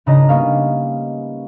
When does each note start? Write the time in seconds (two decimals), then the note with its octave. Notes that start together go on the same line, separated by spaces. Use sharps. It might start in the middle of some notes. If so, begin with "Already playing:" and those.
0.06 G#1 C#3 D4 D#5 A#5 A#6
0.29 G3 A#3 B3 C#4 D#5 F5